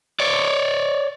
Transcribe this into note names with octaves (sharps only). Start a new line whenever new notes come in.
C#5 D5